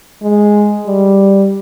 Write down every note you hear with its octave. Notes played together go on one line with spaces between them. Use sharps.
G#3
G3